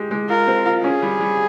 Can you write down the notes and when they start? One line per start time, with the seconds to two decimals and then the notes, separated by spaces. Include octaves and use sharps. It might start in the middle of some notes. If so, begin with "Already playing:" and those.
Already playing: G#3 G4
0.11 G#3
0.30 F4 A#4
0.48 C4
0.66 F4
0.84 C#4 G#4
1.02 G3
1.20 G3